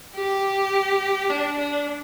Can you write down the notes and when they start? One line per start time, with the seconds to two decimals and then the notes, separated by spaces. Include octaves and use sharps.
0.16 G4
1.30 D4
1.58 D4